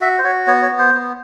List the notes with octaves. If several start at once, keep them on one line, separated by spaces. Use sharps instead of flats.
F#4 E5
C5
F#4 C#5
B3 C#5
C#5
B3
C5
B3